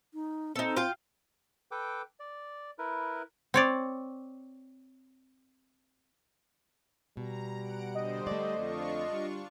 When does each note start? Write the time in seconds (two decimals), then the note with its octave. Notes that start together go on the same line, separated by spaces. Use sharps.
0.14 D#4
0.56 C4 D#4 A4
0.76 F4 F5 G5
1.71 A4 B4 G5 D6
2.20 D5
2.78 E4 A#4 B4
3.54 C4 C#5 D5
7.17 B2 G3 A#5
7.60 F#5 D7
7.95 D3 C5 D#5
8.27 A3 D5
8.58 F2 D4 F4 C#6
9.12 G3